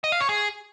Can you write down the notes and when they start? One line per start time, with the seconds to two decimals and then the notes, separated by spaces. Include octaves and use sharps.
0.04 D#5
0.12 F5
0.20 C#5
0.29 G#4